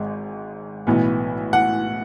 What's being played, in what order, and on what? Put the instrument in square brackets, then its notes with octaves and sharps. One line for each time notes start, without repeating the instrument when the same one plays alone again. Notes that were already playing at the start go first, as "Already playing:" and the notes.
Already playing: [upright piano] G#1 G#2 G#3
B1 A2 E3 B3
F#5